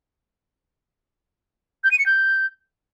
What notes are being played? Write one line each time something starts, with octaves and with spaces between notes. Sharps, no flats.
G6
D#7
C#7
G6